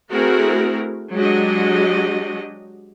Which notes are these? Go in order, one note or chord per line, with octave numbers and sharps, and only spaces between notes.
A3 C4 E4 F#4 G#4 A#4
F#3 G#3 D4 F#4 G4 D#5